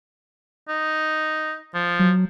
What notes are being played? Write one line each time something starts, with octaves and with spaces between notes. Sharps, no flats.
D#4
F3
F#3